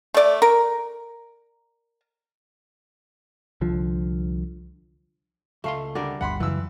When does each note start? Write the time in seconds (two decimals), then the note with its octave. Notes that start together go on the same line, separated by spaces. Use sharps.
0.14 A3 D5
0.42 A#4
3.61 C2 D3 F3
5.64 C#2 A3 F5 C6
5.95 D3 G3 A#4 D5
6.21 G1 D2 F#5 B5 C6
6.40 F#2 C#3 E3 E6